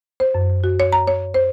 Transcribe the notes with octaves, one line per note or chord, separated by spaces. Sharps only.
C5
F#2
F#4
C#5
A#5
C#5
C5